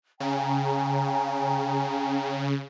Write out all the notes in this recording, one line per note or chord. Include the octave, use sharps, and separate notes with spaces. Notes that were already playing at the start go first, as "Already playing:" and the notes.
C#3 G5 G#5 A#5